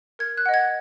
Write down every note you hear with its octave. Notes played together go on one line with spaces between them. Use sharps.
A#4 G#6
F#6
D#5 F#5
G#6